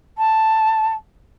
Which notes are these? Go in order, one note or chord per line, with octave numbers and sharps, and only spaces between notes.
A5